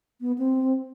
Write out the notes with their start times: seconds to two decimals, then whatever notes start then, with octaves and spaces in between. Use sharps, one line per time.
0.21 B3
0.38 C4